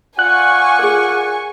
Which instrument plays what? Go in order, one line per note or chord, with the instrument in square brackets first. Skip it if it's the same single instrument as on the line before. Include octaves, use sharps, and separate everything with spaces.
[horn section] F4 D5 F#5 [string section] G#5 C#6 [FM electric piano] F#6
[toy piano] G#4 A#4